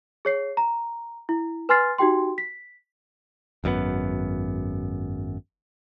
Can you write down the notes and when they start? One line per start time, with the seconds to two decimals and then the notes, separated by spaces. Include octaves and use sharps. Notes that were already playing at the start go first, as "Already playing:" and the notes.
0.25 G#4 C#5 C7
0.57 A#5
1.29 E4
1.69 B4 G#5 C6 F6 A6 C7
1.98 D#4 F#4 G4 G5 C6
2.38 B6
3.64 G#1 F#2 C#3 B3